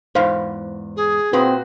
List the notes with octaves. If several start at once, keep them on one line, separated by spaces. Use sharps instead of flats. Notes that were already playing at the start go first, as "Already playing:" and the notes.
E2 G#2 C5 F5
G#4
A#2 C4 F#4 B4